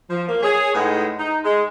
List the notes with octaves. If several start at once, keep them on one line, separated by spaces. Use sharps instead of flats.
F3
A#3
G#4 C#5
A2 G#3 D#4 B4 D#5 F#5
D#4
G#3